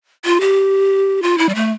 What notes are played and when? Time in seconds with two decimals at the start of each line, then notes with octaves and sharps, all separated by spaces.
0.25 F4
0.41 G4
1.23 F4
1.38 E4
1.49 G3
1.55 A3